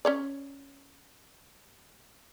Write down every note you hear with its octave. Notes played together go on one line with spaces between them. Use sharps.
C#4 C#5 D5